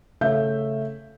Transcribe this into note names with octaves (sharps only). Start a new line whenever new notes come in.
C#3 A3 E5 F5 G6